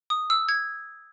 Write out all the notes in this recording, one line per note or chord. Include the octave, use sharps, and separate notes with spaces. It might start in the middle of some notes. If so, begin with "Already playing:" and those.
D#6
E6
G#6